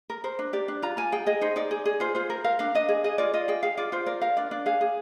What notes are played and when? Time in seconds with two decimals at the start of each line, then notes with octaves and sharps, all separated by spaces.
0.10 A#4
0.24 A#4 C5
0.39 D4
0.53 G4 D5
0.68 D4
0.82 F4 A#5
0.97 F4 G#5
1.12 G#4 G5
1.26 G#4 D#5
1.41 D#4 C5
1.56 D#4 D5
1.71 G#4
1.85 G#4
2.00 F4 C5
2.15 F4 C5
2.30 A#4
2.44 A#4 F5
2.59 D4 F5
2.75 D4 D#5
2.89 G#4
3.04 G#4 D#5
3.18 F4 D5
3.34 F4 D#5
3.48 G#4 G5
3.63 G#4 F5
3.77 F4 D5
3.92 F4 C5
4.06 A#4 D5
4.21 A#4 F5
4.37 D4 D5
4.51 D4 D5
4.66 G#4 F5
4.81 G#4